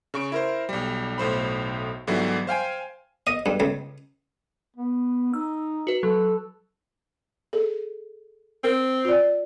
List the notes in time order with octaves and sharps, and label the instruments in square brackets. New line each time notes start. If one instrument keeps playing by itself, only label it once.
[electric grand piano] C#3 C#6 D7
E4 A#4 C5
B1 G3
B1 A2 C5 B5
G#2 D3 E3 F#3 G3 B3
C5 F5 G5 G#5
[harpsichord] D#5
G2
C#2
[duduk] B3
[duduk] D#4 [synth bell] E6
[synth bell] F#4 B4
[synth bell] F#3 [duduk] A4
[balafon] G#4 A4
[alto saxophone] C4 [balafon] A#4
[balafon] F4 D5